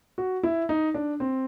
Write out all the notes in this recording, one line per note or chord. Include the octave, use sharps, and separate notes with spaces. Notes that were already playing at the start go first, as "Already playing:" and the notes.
F#4
E4
D#4
D4
C4